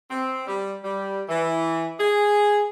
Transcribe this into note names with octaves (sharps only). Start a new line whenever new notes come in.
C4
G3
G3
E3
G#4